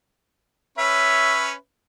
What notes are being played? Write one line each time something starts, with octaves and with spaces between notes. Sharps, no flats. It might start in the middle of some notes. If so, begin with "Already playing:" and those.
C#4 B4 C#5 E5